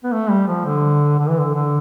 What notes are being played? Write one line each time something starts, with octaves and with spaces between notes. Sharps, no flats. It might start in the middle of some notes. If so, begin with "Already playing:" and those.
B3
A3
G3
F3
D3
D3
E3
D3
D3